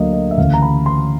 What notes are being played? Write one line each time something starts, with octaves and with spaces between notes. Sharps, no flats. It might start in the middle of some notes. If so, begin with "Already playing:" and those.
Already playing: D2 D3 F#3 A#3 D#5
D#5
E5
D2 C#3 E3 F5
A#5
B5
C6